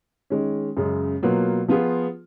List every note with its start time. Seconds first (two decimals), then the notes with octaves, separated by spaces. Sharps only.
0.30 D#3 G#3 C#4
0.77 F#2 C#3 G#3
1.23 B2 F#3 A#3 F4 B4
1.68 F3 B3 F4 G#4